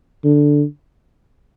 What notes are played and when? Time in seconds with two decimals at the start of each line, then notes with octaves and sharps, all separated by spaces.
0.24 D3